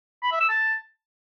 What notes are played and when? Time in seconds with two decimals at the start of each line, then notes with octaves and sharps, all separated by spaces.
0.23 B5
0.32 E5
0.40 E6
0.49 A5